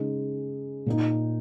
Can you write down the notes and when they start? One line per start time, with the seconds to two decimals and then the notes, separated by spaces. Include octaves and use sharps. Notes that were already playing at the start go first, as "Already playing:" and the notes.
Already playing: C#3 G#3 D#4
0.86 A#2 A#3 D#4